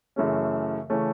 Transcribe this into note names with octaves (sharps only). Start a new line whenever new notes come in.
F#2 C#3 E3 A3 C#4
C#3 E3 A3 C#4